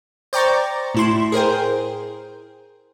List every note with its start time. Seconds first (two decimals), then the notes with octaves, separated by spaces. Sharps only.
0.33 C5 D5 G5 A#5 C#6 A6
0.95 A2 E4 C6
1.32 G#4 A#4 C5 G5